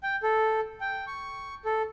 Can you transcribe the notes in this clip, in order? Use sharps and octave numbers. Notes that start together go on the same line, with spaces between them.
G5
A4
G5
C#6
A4